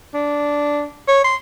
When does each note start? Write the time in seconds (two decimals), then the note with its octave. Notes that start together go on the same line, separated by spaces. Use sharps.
0.14 D4
1.08 C#5
1.24 C6